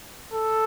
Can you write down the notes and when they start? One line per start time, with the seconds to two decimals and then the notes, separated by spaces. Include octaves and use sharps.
0.33 A4